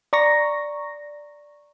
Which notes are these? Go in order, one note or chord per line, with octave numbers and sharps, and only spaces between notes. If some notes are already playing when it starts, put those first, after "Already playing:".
D5 A#5 C#6 A#6